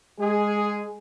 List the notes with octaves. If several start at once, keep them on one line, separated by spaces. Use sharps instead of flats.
G#3 G#4